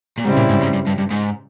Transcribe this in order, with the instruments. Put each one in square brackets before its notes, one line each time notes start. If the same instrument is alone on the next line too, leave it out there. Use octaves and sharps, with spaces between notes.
[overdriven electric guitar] A#2
[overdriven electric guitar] G#2 [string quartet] C#3 G3 C4 E4
[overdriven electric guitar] A#2
G#2
G#2
G2
G2
G2
G#2